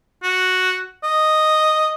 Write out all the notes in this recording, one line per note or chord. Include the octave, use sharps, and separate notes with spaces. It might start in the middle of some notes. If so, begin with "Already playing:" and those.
F#4
D#5